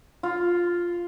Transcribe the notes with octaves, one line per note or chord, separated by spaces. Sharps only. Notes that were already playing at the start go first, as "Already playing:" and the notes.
F4